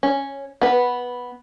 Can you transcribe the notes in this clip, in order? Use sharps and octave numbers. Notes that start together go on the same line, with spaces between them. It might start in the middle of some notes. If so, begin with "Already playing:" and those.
C#4
B3 B4